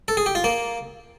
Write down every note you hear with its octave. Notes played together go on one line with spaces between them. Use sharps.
A4
G#4
G4
F4
A#3